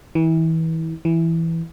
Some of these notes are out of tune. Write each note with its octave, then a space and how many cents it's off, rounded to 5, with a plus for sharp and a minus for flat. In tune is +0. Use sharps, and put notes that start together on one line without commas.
E3 -30
E3 +0